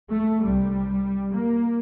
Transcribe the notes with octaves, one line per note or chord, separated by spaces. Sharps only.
A3
C2 C3 G3
A#3